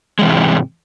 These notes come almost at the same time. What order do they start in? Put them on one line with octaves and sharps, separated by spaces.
G#3 E3 C3 G#2